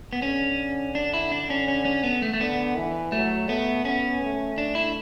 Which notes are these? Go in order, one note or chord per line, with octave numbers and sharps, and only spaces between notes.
B3
D3 C#4
D4
E4
D4
C#4
C#4
C#4
B3
A3
A3
D3 B3
E3
F#3 A3
A3 B3
B3 C#4
A3
D4
E4